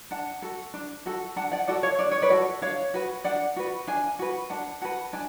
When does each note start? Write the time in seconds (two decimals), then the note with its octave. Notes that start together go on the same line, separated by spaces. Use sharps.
0.11 D4 F#5 A5
0.42 F#4 A4
0.74 D4
1.06 F#4 A4
1.36 D4 F#5 A5
1.52 D5 F#5
1.68 F#4 A4 D5 F#5
1.83 C#5 F5
1.99 D4 D5
2.11 C#5
2.22 B4 D5
2.30 F#4 A4
2.61 D4 C#5 F5
2.94 F#4 B4
3.24 D4 D5 F#5
3.56 F#4 B4
3.87 D4 F5 G#5
4.19 F#4 B4
4.50 D4 F#5 A5
4.81 F#4 B4 F#5 A5
5.13 D4 G#5